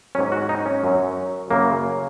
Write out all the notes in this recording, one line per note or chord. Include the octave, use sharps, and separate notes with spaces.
G#2 F#3 C#4
F#4
D#4
C#4
F#2 F#3
F#2 C#3 F#3 A#3